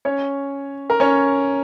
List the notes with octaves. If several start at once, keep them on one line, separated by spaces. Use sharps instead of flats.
C#4 C#5
A#4
C#4 C#5